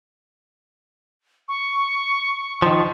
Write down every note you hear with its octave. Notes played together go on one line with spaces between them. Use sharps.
C#6
D#3 F3